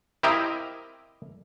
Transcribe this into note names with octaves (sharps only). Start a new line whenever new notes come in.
C4 E4 G4 A#4 D#5 F5